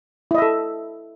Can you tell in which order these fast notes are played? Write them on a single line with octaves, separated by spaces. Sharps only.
E4 D#5 E5 A4